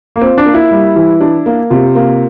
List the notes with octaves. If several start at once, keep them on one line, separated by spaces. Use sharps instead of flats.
A#3
C4 F4
D4
A#3
E4
G3
E3
D4
A#3
C3 F4
A#3